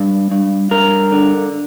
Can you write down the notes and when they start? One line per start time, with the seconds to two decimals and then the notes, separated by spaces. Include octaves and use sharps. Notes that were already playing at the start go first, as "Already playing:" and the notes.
Already playing: G2
0.31 G2
0.71 G2 A#4
1.12 D3